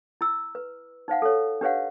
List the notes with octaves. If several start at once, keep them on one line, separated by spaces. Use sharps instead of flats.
E4 E6
B4
D#4 C5 F5 F#5
A4 C#5
D4 G4 B4 C#5 F5 F#5